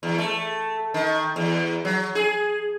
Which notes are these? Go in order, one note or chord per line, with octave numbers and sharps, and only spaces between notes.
E2
A3
D#3
E2
F#3
G#4